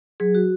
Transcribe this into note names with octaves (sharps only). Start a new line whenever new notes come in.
F#3 G#4
F#4